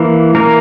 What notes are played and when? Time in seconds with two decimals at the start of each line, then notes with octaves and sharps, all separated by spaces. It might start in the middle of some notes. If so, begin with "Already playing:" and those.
Already playing: E3 A#3
0.35 E3 A#3 A#4